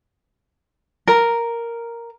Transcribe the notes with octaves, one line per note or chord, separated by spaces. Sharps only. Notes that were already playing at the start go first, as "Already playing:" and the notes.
A#4